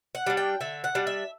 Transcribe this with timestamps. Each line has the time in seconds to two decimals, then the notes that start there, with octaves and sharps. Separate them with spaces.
0.15 F#5
0.26 G3 D4
0.37 G5
0.61 D3 E5
0.84 F#5
0.95 G3 D4
1.07 E5